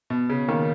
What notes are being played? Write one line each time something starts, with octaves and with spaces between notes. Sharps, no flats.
B2
C#3
D#3 A#3